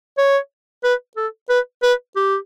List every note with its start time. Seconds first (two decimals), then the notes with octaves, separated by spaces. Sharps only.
0.18 C#5
0.83 B4
1.17 A4
1.49 B4
1.83 B4
2.16 G4